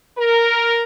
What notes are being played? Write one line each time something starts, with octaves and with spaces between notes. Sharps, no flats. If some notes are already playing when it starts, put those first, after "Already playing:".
A#4